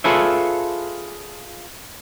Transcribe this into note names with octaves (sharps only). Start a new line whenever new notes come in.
F4 G#4 A4 B4 C#5 E5